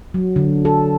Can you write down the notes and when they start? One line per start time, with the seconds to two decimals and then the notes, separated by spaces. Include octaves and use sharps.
0.14 F#3
0.36 D3
0.65 A4